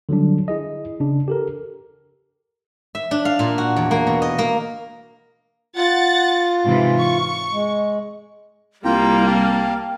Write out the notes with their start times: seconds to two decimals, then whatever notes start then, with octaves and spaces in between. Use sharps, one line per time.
0.09 D3 F#3 G3 D4
0.48 E4 G#4 D#5
1.00 C#3 D4
1.28 G4 A4 A#4
2.95 E5
3.11 D4
3.25 F5
3.39 A#2
3.58 F#4
3.76 E2
3.91 A#3
4.07 B2
4.22 D#5
4.39 A#3
5.76 F4 F#5 A6
6.64 G#2 C3 E3
7.00 C#6
7.53 G#3
8.85 C2 G3 A#3 E4 F4 G5 A#5
9.26 F5 G5 A5